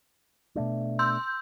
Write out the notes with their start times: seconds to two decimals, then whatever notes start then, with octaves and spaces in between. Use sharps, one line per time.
0.55 B2 A3 D4
0.99 C6 E6 G6